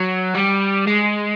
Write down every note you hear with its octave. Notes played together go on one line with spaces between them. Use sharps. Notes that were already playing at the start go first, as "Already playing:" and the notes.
Already playing: F#3
G3
G#3